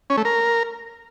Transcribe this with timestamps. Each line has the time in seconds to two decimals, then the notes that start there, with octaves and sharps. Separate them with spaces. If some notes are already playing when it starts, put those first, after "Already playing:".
0.10 C#4
0.17 A3
0.25 A#4